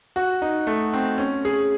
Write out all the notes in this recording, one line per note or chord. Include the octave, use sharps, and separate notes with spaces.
F#4
D#4
A3
C4
C#4
G#4